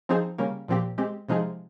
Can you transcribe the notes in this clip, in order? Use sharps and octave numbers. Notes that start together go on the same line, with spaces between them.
F3 C4 D#4 G#4 C5
C#3 G3 A#3 C#4
A#2 F3 C4 G4
G#3 C4 G4
C3 F3 G#3 D#4 G#4